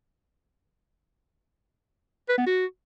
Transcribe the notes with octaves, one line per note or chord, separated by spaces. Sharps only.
B4
B3
F#4